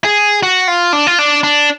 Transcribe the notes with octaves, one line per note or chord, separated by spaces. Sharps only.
G#4
F#4
F4
D4
F4
D4
D4